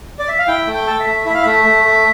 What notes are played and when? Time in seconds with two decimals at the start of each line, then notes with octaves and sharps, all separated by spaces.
0.19 D5
0.28 E5
0.39 F5
0.47 E4 G5
0.67 A3
0.74 G5
0.87 A4
1.00 E5
1.06 A3
1.26 E4 E5
1.34 F5
1.42 A3 E5
1.65 A3
1.84 A3